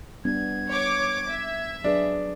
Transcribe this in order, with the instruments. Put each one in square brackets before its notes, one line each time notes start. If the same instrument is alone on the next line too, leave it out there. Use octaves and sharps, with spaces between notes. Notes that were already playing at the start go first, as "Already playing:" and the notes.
[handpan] G3 B3 D4 [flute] G#6
[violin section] C#5 D6
E5
[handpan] F#3 G#4 B4 [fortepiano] D4